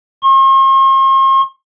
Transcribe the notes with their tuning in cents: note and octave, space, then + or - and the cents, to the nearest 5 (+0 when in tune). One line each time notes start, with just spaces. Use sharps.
C6 +45